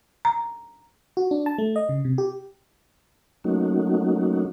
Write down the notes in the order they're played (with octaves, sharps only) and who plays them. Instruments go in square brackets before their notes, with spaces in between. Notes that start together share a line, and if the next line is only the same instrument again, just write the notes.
[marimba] A#5
[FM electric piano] F#4
D4
A5
A3
D#5
C#3
C3
G4
[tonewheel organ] F#3 A3 A#3 C#4 D#4 F#4